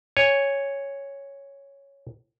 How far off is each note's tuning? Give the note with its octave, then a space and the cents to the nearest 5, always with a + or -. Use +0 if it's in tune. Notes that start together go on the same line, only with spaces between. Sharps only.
C#5 +0 G#5 -15